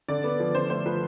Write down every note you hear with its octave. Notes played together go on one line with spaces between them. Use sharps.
D3 D5
B3
F3
D3 C5
A3 C5
F3 B4